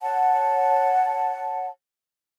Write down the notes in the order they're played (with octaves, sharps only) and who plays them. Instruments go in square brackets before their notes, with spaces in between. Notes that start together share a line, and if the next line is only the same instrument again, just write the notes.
[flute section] C#5 F#5 A5